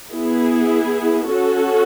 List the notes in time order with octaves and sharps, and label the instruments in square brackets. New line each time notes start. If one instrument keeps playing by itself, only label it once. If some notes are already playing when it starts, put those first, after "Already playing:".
[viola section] B3 E4 G#4
C#4 F#4 A4